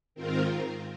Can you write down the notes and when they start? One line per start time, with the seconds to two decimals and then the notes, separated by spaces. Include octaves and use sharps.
0.15 G#2 D#3 C4 F4 A#4